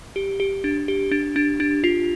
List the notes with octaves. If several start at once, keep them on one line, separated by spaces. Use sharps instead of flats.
G4
G4
D4
G4
D4
D4
D4
F4